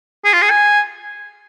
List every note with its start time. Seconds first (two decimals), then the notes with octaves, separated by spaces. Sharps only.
0.25 G#4
0.33 F4
0.42 G#4
0.50 G#5